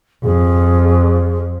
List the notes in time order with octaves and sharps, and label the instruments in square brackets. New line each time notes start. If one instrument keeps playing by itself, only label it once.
[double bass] F2 [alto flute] G#4